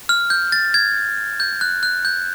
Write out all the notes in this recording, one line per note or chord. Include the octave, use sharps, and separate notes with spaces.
F6
G6
A6
G#6
G6
F#6
F#6
G6